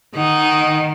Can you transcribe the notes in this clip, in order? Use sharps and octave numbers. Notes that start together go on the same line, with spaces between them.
D#3 D#4 F#5